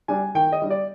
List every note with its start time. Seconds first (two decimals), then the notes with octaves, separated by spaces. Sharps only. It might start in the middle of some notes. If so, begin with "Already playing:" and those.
0.08 G3 D4 G#5
0.35 D#3 G5
0.52 D#5
0.62 G3 D4
0.70 D5